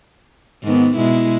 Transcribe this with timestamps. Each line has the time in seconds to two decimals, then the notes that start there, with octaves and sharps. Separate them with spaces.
0.63 G#2 D#3 B3
0.96 B2 G#3 E4